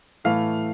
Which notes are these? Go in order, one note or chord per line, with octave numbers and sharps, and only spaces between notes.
A2 E3 A3 F5